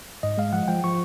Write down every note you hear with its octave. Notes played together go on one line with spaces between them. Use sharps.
G#2 D#5
G#3 F5
F3 F#5
F3 G5
F3 C#6